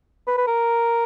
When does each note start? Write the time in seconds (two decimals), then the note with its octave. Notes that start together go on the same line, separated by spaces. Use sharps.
0.27 B4
0.38 B4
0.47 A#4